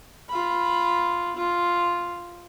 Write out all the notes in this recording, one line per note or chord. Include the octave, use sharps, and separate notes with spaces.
F4 B5
F4